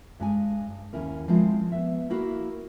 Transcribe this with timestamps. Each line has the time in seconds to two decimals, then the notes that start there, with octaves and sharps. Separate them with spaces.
0.20 G2 G#3 G#5
0.93 D#2 C#4 E4 A#4
1.28 F3 G#3 C4 E4 F4
1.72 B3 E5
2.10 A#3 E4 F#4 A#4 F5